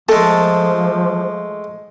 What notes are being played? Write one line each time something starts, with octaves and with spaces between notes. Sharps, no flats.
F3 G#3 A3 A4